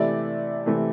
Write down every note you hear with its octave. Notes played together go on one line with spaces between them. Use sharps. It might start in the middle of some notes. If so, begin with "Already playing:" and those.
Already playing: C3 E3 A3 D5
C3 E3 A3